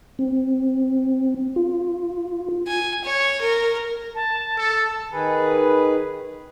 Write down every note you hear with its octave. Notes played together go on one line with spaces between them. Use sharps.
C4
F4
G#5
C#5
A#4
A5
A4
D#3 G#4 B4